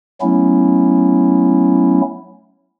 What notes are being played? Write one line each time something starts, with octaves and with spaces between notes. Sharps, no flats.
F#3 A3 B3 C#4 E4